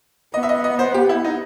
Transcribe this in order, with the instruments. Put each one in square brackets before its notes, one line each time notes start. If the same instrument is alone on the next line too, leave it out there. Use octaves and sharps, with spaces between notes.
[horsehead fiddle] B3 [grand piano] D#5
[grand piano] E5
D#5
D#5
C5
G4
E4
D#4